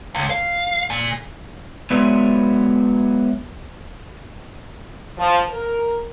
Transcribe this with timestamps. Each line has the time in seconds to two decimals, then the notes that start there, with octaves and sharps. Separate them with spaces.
0.15 C#2
0.30 F5
0.90 A#2
1.90 F#3 G#3 B3 B4 D5 E5
5.18 F3
5.50 A#4